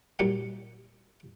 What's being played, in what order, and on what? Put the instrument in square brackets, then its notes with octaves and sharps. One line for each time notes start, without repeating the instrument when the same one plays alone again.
[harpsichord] A#2 F#3 G3 D#4 F#5